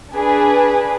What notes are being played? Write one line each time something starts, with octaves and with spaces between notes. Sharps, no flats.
D4 G#4 B4